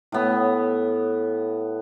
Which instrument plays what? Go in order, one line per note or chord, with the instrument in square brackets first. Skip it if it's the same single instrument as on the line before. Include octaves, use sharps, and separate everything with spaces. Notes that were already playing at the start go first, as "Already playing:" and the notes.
[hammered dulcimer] A2 B3